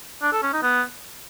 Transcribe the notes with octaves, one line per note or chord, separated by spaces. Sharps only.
D4
A4
C#4
D#4
B3